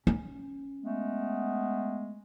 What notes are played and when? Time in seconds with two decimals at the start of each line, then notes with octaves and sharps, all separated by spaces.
0.07 C#4
0.82 G#3 A3 B3